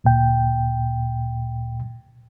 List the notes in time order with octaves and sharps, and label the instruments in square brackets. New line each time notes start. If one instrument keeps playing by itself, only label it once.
[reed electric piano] D2 A#2 G5